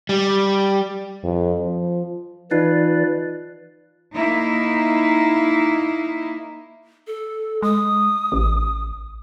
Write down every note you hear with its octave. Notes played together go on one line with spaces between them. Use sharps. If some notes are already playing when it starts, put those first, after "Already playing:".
G3
F2
F3
E3 D#4 F4 B4 D5 C7
A#3 D#4 E4
A4
G#3 D#6
A1